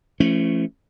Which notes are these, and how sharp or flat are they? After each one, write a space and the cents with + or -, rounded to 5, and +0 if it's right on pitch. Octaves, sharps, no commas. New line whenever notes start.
F3 -45 A3 +0 C#4 -10